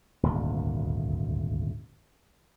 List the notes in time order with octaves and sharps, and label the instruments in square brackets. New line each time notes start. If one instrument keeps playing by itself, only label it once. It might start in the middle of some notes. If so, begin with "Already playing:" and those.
[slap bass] D#1 G#1 D2